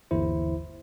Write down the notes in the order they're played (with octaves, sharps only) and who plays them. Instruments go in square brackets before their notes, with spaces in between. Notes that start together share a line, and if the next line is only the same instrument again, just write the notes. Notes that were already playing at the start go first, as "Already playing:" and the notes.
[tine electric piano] G1 D#2 E3 E4 C5